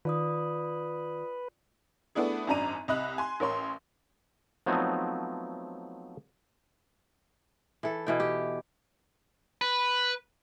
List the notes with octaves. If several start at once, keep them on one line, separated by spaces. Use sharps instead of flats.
D#3 F4 B4 D5 D#6
A3 B3 D4 E4 G#4
G#1 F#2 D4 A#5 D#7
C2 D#5 B5 F#6
G#5 C6
A1 A#4 C#5 C6
F3 F#3 A3 B3 C4 D#4
E3 A4
B2 E3 G5
G4
B4